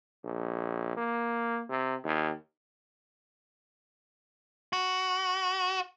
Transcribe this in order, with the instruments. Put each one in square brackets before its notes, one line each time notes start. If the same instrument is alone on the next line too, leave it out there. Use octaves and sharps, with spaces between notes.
[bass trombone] A#1
A#3
C3
D#2
[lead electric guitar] F#4